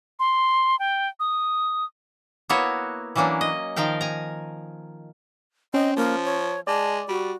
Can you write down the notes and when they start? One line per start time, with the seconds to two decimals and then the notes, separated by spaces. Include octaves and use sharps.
0.19 C6
0.79 G5
1.20 D#6
2.49 A#3 B3 E4 F#4 C#5
3.16 E3 F#3 A#3 C#4 D4
3.41 D#5
3.76 D#3 F3 A#4 F5 G5
4.01 G#5 A#5
5.74 C4 C#4 D#5
5.97 F3 A#3
6.25 C#5
6.67 G#3 D5 A5
7.08 G3 F#4